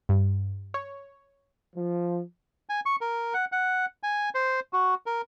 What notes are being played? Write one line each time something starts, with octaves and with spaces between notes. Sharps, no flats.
G2
C#5
F3
G#5
C#6
A#4
F#5
F#5
G#5
C5
F#4
A#4